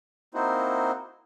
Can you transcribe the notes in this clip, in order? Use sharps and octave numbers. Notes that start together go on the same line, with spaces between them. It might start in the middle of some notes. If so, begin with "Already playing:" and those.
A#3 C4 D#4 E4 F#4 C5